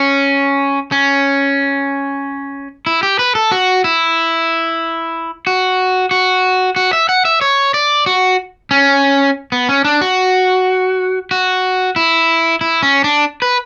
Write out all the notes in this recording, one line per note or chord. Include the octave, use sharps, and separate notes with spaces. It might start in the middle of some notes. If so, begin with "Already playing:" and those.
Already playing: C#4
C#4
E4
G4
B4
A4
F#4
E4
F#4
F#4
F#4
E5
F#5
E5
C#5
D5
F#4
C#4
B3
C#4
D4
F#4
F#4
E4
E4
C#4
D4
B4